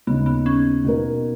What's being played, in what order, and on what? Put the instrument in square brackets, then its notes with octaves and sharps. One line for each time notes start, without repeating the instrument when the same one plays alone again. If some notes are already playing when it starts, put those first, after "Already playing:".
[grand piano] D#2 C#3 G#3 D#4 [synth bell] B3
[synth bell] B3
C#4
[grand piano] B2 A#3 D#4 A#4